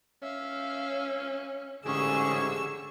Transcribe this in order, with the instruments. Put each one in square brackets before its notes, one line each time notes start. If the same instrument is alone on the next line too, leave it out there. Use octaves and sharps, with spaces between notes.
[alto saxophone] C#4 [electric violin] E5 F5
[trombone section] A1 G#2 G#4 [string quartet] D3 E6 [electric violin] C#4 C#6 [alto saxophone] G4